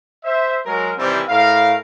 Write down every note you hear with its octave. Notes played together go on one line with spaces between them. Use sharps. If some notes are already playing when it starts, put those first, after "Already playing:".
C5 E5
F#3 G#3 A#4
C3 D#3 E3 G3 C4
A2 A#4 F5